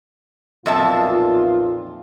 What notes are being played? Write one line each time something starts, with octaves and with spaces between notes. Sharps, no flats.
B1 F2 A#2 F4 E5 A5